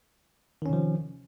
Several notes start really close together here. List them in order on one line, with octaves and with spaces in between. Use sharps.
D#3 C#4 C3 F3